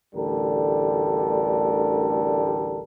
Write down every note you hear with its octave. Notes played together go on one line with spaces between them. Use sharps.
A1 D2 D3 G3 A4 A#4